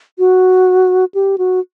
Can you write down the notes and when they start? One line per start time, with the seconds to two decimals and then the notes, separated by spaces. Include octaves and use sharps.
0.19 F#4
1.14 G4
1.38 F#4